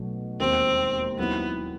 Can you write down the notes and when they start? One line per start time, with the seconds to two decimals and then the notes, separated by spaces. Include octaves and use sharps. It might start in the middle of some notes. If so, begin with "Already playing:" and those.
Already playing: B1 B2 F#3 A3
0.40 E1 D#2 D#3 C4
1.19 D#2 D#3 F#3 B3 C4 E4